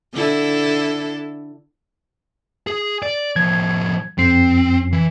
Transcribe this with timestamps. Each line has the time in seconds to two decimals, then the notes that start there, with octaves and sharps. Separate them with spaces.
0.13 D3 E4 A4
2.67 G#4
3.03 D5
3.36 A2 F3 G#6
4.18 F2 C4 C7
4.92 E3